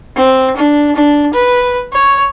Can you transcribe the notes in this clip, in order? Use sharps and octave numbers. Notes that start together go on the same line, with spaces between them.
C4
D4
D4
B4
C#5